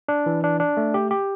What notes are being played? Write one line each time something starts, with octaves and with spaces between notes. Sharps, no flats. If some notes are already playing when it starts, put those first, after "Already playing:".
D4
E3
D4
D4
A3
G4
G4